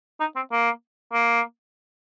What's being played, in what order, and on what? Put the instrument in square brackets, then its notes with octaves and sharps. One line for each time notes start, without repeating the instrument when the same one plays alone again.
[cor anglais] D#4
C4
A#3
A#3